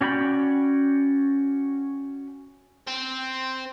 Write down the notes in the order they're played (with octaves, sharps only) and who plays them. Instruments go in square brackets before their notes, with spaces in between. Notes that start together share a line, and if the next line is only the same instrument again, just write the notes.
[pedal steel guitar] C#4 F#4 D5 G5 B5
[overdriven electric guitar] C4